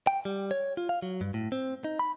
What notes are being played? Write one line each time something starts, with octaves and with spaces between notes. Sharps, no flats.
G5
G3
C#5
F4
F5
F#3
G2
A2
C4
D#4
B5